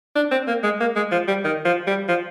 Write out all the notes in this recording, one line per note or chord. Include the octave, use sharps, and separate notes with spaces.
D4
C4
A#3
G#3
A#3
G#3
F3
G3
D#3
F3
G3
F3